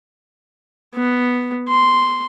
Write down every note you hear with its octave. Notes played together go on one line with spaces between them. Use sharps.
B3
C6